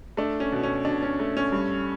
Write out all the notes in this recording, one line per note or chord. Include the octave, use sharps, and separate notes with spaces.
A3 D4
C#4
B2
C#4
B2 D4
C#4
A3
C#4
G2